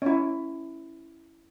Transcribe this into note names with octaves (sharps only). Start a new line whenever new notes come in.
C#4 E4